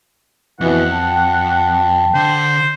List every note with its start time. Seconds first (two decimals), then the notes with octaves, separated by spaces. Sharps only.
0.61 F2 B2 E3 F#5
0.92 G5 A5
2.15 D3 C5